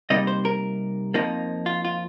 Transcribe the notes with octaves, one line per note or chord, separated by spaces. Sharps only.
C3 G3 A#3 D#4 D#5
C5
A#4
F2 F3 A#3 D#4
F4
F4